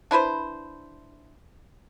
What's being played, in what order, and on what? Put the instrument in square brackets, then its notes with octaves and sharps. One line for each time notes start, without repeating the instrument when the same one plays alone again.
[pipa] D4 E4 B4 C5